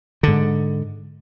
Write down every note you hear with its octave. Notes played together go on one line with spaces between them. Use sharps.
G#2 D3